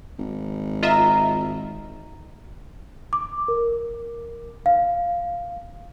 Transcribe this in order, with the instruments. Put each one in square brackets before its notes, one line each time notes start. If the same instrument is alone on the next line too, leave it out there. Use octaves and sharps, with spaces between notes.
[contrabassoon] G#1
[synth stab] F4 D#5 E5 [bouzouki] A#4 A#5
[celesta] D6
A#4
F5